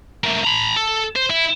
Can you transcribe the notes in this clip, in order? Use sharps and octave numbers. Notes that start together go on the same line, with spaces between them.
A3 A#3
A#5 B5
A4
C5
E4